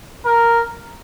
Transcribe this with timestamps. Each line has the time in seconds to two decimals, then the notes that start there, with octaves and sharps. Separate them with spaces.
0.26 A#4